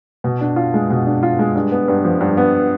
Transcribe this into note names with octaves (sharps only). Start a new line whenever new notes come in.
B2
D4
F4
G#3
B2
D4
F4
G#3
G2
B3
G2
F3
G2
B3